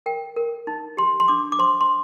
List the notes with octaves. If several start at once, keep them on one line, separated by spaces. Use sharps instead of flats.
A#4 G5
A#4
D#4
G4 C6
C6
D4 D6
D6
C5 C6
C6